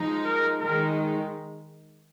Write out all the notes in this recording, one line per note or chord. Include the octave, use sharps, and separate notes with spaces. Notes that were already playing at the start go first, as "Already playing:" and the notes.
Already playing: F3 G#3 D#4
A#4
D#3 G#3 D#4 A#4